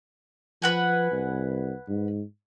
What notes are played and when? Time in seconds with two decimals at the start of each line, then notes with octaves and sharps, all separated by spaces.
0.62 F3 B4 F#5 G#5
1.12 C2
1.89 G#2